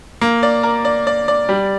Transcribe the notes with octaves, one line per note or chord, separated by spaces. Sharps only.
A#3
D5
A#4
D5
D5
D5
G3